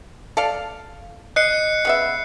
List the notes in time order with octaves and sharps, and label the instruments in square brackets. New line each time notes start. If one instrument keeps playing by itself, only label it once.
[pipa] A4 D5 F5
[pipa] D#5 [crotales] F#6 C7 C#7
[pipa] C#3 B3 E5